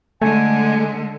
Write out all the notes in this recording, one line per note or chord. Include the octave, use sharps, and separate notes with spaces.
D3 G#3 A3 G#5